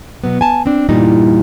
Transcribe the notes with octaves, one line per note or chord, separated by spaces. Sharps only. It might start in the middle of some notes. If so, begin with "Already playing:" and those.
B2 F#3 B3
G#5 A5
C4 D4
E2 G2 A#2 G3 D#4 D#5